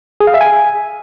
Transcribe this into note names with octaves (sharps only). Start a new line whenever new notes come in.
G#4
F5
E5
G#5